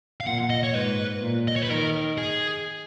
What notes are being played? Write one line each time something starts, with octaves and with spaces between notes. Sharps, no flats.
F5
A#2 F#5
D#5
C#5
G#2 B4
A#2
D#5
C#5
B4
D#3 A#4
G#4